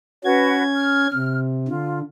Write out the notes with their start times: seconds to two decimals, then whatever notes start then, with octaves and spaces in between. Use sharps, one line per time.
0.24 C#4 F#4 B4 G#6
0.76 F6
1.14 C3
1.68 D3 F4